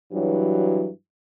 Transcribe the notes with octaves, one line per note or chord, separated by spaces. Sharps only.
G2 E3 F#3